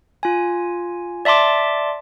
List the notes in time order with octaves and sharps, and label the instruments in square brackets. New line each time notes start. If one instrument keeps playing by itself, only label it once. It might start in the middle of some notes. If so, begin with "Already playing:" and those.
[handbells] F4 G#5
D5 E5 A5 C6 D6